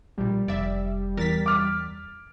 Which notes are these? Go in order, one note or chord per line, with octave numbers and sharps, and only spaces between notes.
A#1 A#2 G3
F1 D5 E5
E2 A#4 A6 B6
D6 F6